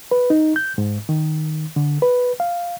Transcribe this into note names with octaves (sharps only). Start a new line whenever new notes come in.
B4
D#4
G6
G#2
D#3
D3
B4
F5